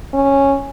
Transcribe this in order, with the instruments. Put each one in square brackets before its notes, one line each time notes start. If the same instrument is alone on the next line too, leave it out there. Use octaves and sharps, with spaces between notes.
[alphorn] C#4